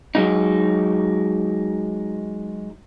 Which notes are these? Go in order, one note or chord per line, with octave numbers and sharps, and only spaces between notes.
F#3 G#3 D#4